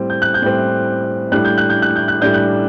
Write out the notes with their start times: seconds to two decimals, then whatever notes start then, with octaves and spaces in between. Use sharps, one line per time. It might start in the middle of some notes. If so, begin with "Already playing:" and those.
Already playing: A2 G3 C4
0.10 G6
0.22 F#6
0.34 G6
0.42 A2 G3 C4
1.32 A2 G3 D4 F#6
1.45 G6
1.58 F#6
1.70 G6
1.82 F#6
1.96 G6
2.08 F#6
2.22 A2 G3 D4 G6
2.34 F#6